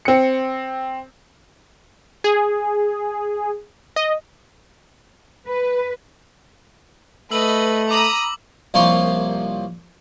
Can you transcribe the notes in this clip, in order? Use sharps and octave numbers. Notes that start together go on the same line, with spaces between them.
C4 C#7
G#4
D#5
B4
A3 B4 D#5 E6 F#7
A#5 B5 D6 D#6 F#7
C2 F3 A#3 F4 C#5 C6